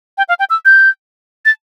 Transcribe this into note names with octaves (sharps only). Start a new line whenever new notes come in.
G5
F5
G5
E6
G6
A6